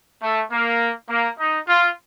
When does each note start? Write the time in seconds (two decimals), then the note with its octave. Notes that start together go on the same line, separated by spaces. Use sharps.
0.23 A3
0.52 A#3
1.09 A#3
1.39 D#4
1.68 F4